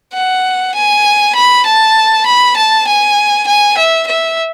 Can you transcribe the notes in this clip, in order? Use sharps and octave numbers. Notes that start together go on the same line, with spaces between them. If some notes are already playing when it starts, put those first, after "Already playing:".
F#5
G#5
B5
A5
B5
A5
G#5
G#5
E5
E5